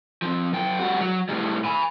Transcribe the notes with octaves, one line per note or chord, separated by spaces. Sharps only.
F2 F3
F#2 G5
G3 F#4
F#3
A2 G3
G#5 B5